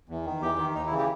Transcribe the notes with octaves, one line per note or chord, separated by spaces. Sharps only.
E2
D#3
E2 G4
D#3
D#2 D#4
E4
C#3 E3
G4